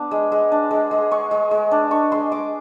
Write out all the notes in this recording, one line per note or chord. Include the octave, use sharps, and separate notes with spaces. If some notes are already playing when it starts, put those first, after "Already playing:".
Already playing: B3 D4
G#3
G#3
D4
G#3
G#3
G#3 C#6
G#3
G#3
D4
D4 C#6
G#3 C6
G#3 D6